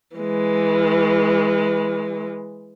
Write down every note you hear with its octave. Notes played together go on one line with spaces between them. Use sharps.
E3 G#3